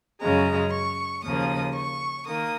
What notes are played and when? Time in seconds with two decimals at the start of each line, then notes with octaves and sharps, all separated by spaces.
0.21 F#2 C#3 G#3 A#5
0.72 C#6
1.24 D#2 C#3 F3 A#3 D#6
1.75 C#6
2.26 D#3 A#3 D#6